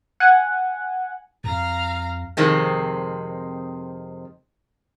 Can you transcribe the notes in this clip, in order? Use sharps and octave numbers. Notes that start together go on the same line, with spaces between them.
F#5 G#5
F2 F5 A#5
F2 C3 D#3 G#3 C4